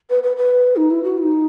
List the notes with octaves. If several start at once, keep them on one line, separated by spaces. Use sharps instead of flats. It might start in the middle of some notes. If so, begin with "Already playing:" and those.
B4
B4
B4
D#4
E4
F#4
E4
D#4